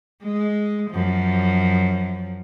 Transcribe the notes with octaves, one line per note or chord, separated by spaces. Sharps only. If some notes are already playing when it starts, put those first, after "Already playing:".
G#3
F#2 F3